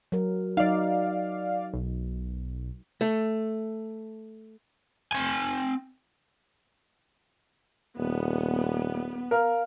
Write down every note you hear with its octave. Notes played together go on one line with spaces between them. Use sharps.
F#3 A#4
F#3 D#4 D5 F5
B1
A3
C4 G#5
D#1 B3
A#4 F5